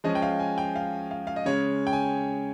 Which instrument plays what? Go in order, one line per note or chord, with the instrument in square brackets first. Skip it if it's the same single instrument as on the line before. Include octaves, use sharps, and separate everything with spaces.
[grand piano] F3 G#3 C#4 D#5
G5
F5
G#5
G5
F5
F5
F5
D#5
C#3 G#3 C#4 C#5
G5
G#5